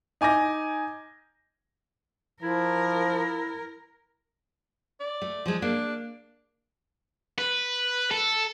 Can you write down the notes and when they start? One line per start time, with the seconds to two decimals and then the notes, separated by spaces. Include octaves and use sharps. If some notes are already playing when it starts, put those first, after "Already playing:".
0.21 D#4 G#5 D6 G6 A#6
2.43 F3 E4 A#4
5.01 D5
5.22 A3
5.46 F3 G#3
5.62 A#3 D4
7.38 B4
8.11 A4